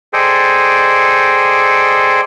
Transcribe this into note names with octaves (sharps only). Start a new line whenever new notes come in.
G#4 A4 C5 D5 D#5 G5